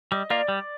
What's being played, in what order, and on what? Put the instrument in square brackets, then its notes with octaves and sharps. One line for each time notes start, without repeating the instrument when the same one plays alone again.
[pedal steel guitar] G3 [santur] D#5
[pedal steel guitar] A#3 F4 [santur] D5
[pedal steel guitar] G3